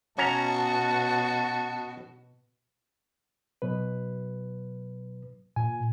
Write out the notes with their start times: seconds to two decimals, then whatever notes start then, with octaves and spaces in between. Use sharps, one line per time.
0.18 B2 C#4 F#4 D#5 A5 A#5
3.62 B2 F#3 B4
5.56 A#2 G#5